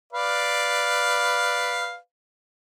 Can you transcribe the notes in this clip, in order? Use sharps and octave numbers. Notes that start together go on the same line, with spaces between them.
B4 D5 F5